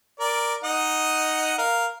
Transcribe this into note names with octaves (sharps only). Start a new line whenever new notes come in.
A#4 D5
D#4 D#5 F#5
A#4 F5